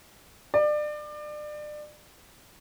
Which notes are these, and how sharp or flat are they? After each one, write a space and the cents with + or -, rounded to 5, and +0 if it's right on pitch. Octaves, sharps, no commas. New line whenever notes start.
D5 +30